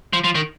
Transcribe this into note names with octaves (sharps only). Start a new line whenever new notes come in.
F3
F3
D#3